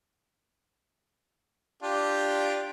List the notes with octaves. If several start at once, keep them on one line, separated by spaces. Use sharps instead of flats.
D4 F4 G4